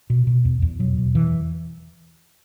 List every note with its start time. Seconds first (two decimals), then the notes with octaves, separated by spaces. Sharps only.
0.10 B2
0.27 B2
0.45 E2
0.62 E2
0.79 B2 F#3
0.98 B2
1.15 E2 E3